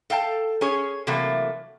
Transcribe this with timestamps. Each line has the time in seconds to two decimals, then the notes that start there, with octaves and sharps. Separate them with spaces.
0.10 A4 F5 G5 A5
0.61 C#4 G#4 C#5
1.07 C3 E3 F#3 A3 A#3